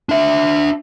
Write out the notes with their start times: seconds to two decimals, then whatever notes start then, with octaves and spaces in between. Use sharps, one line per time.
0.09 D4 E5